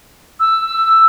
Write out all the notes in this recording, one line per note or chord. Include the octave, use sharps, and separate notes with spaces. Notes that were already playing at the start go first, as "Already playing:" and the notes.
E6